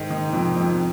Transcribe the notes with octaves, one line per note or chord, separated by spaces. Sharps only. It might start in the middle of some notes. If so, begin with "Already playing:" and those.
Already playing: G#2 D#3
D#3
F2
F2